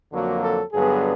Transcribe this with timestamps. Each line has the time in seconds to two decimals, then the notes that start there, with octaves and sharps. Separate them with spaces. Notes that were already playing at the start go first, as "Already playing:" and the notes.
0.12 F2 D3 F#3 A#3 F#4
0.43 A4
0.72 G2 D3 F#3 B3 G#4